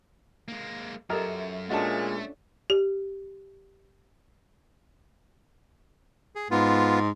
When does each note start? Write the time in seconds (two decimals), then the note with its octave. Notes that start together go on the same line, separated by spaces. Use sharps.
0.48 G#3 A#3
1.10 F#2 F4 G4 A4 A#4 D#5 E5
1.70 A#2 G#3 A3 C#4 D4 F#4 A5
2.70 G4
6.35 G#4
6.51 G#2 B3 F4